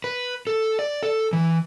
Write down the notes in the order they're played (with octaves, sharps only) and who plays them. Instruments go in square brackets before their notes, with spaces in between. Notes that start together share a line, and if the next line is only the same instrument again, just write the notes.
[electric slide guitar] B4
A4
D5
A4
E3